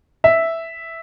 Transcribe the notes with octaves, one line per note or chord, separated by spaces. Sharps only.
E5